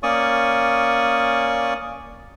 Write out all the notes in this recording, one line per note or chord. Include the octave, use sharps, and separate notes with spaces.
A#3 C#4 D5 C#6 D#6